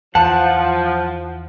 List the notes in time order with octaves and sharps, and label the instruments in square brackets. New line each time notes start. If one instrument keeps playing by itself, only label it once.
[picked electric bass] E2 [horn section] F3 [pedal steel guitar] F#5 [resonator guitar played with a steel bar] A5